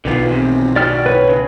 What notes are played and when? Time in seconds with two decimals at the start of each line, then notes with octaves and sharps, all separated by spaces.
0.05 B1 D3 D#3 B3 F4
0.27 E2 C3
0.76 E4 F#4 D5 G5 F6
1.06 B4 C#5
1.29 C#3